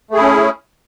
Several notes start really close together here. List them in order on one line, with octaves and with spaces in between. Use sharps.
A3 G#4 E4 C#4